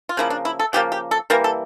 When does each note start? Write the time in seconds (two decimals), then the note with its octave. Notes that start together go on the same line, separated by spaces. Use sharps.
0.09 F4
0.17 C#3 F3 A#3 E4
0.30 D4
0.45 E4
0.59 A4
0.73 C#3 F3 A#3 G4
0.92 G4
1.11 A4
1.30 E3 G3 A#3 A#4
1.44 A4